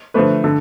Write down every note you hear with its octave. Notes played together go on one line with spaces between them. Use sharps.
D3 F3 A3 B4
D3 A4